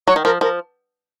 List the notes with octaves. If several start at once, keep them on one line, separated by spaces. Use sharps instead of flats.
F#3 C#5
D#3
F3 A#4
F3 A#4